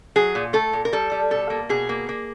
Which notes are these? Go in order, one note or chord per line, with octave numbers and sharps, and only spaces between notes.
F#3 G#4
A#2
A3 A4
A#2
A#4
G3 A4
G3
B2 A4
A#3
B2 G#4
A#3
A#3